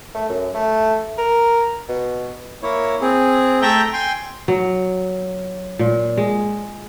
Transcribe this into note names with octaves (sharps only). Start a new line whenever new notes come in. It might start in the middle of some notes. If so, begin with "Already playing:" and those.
A3
F#2
A3
A#4
B2
A#3 E4 C#5
C4 G#4
A3 A4 E5 G5 A#5 G6
G5 G#5 C6
F#3
A#2
G#3